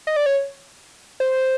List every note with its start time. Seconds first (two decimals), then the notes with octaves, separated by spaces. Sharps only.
0.07 D#5
0.16 D5
0.26 C#5
1.20 C5